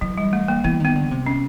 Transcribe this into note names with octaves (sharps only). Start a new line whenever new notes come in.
E3 F#3
G3
A3
A#3
E3 B3
D#3
B3
D3
C3
C#4